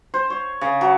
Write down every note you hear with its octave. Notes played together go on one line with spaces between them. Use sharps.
C5
C#5
C#3
F#3